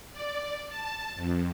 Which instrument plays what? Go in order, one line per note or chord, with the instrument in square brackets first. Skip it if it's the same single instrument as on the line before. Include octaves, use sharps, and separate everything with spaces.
[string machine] D5
A5
F2